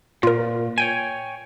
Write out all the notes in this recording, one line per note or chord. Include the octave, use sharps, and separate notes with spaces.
A#2 F4 A#4
C#5 G5 G#5 D#7